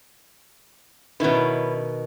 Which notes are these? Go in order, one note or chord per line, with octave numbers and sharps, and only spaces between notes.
B2 D#3 C#4 E4 B4